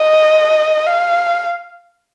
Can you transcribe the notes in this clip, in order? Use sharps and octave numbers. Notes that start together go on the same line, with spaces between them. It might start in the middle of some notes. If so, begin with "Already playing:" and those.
Already playing: D#5
F5